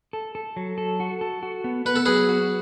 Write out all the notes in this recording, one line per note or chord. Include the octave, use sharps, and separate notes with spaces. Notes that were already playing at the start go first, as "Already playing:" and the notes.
A4
A4
F#3
A4
F#4
A4
F#4
B3
B3 B4
A4
F#3 G#4 B4
F#4